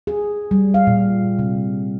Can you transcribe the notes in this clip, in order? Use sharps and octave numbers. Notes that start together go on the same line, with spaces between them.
G#4
G3
F5
A#2
C3